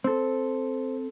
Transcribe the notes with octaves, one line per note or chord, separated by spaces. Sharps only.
C4 A4 C5